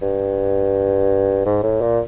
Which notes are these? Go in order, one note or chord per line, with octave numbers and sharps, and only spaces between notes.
G2
G#2
A2
A#2